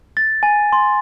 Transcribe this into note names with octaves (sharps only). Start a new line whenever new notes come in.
A6
G#5
C6